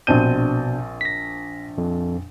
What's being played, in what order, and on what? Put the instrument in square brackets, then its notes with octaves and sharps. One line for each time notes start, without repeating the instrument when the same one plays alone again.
[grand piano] A#1 C4 D#7 [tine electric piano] B2 D4 G6
[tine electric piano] A#6 B6
F2